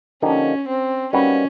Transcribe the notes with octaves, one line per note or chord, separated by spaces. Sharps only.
D3 F3 A#3 C#4 D#4 G4
C4
G3 A#3 C#4 D#4 F#4 B4